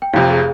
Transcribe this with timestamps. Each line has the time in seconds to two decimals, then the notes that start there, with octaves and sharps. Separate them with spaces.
0.02 G5
0.13 F1 F2 C3 C#5 F5
0.31 G#4